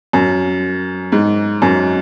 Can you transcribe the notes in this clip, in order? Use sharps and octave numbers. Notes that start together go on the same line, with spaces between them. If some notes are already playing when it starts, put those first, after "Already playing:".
F#2
G#2
F#2